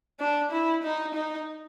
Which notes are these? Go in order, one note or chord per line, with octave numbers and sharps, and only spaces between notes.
D4
E4
D#4
D#4